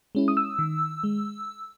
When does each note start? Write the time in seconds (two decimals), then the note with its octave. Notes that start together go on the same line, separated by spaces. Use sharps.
0.15 G#3 C#4 E4
0.28 D#6
0.37 E6
0.59 D#3
1.04 G#3